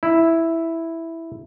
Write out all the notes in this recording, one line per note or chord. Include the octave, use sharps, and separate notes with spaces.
E4